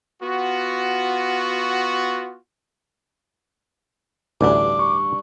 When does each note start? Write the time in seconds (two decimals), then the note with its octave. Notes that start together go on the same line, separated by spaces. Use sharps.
0.22 B3 F4 F#4
4.41 A1 D2 G2 E3 D4 D6
4.79 C#6